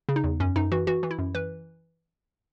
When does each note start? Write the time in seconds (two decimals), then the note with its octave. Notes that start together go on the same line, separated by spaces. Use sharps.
0.09 C#3
0.16 D#4
0.24 E2
0.40 F#2 C#4
0.56 F#2 D#4
0.72 E3 F#4
0.87 E3 F#4
1.03 E3
1.11 E4
1.19 F#2
1.35 E3 B4